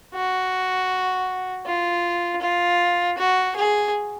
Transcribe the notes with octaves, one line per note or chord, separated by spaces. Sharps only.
F#4
F4
F4
F#4
G#4